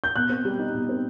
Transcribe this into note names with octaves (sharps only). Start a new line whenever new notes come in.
G6
B2 F#6
C4
G3
D#4
B2
C4